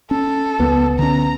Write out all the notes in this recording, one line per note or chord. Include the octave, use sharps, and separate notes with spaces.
C#4 A4
C#2 B3
D3 C#4 A#5